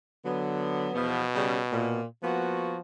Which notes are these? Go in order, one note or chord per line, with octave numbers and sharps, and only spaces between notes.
D3 F#3 B3
E2 B2 F3 B3
C#3 G3
A#2
F3 A#3 B3 F#4